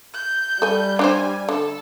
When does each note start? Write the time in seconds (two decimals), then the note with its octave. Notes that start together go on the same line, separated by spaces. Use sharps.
0.14 G6
0.62 G3 A4 G#5
0.99 D4 G4 C5 G#5
1.49 D3 A4